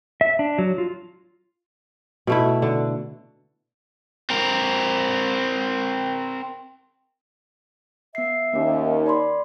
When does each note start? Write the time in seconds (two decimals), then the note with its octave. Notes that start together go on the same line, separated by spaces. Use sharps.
0.21 E5
0.39 D4
0.58 F#3
0.78 F4
2.27 B2 A3 E4
2.62 D3
4.30 C4 A#4
8.15 B3 E5 C7
8.53 D#2 A#3 C#4
9.06 D5 B5 C6